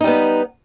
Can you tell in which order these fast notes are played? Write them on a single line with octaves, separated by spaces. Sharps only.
D#4 G3 B3